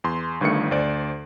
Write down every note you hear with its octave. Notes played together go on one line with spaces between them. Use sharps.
E2 C6
G1 G2 D#3 A3 C#7
D2 C5 D5 D7